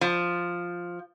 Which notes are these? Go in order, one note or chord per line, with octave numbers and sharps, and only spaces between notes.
F3